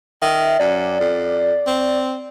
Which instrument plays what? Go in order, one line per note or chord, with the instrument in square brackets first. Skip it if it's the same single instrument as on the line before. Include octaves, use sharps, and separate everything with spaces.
[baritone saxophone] D#3 [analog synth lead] E5
[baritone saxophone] F#2 [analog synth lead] D5
[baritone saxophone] F2
C4